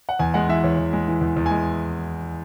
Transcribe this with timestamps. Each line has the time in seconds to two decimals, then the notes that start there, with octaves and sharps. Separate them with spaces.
0.09 F#5
0.19 E2 G#5
0.34 G#3 F#5
0.49 E3 E5
0.64 E2 C#5
0.78 E2
0.93 G#3
1.08 E3
1.21 E2
1.37 E2
1.46 G#5
1.51 G#3